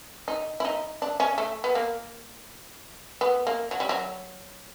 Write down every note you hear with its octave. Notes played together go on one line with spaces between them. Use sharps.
D#4
E4
D#4
D4
C#4
A3
B3
A#3
B3
A#3
F#3
G3
F#3